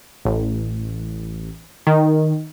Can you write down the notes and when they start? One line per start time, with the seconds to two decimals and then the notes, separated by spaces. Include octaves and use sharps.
0.25 A1
1.87 D#3